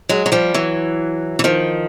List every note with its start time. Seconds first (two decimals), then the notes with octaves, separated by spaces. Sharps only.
0.09 F#3 G#3
0.26 F#3
0.32 F3 G3
0.54 E3 F#3
1.39 E3
1.44 D#3 F3